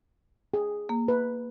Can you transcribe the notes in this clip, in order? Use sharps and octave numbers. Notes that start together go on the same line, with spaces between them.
G#4
A#3
B4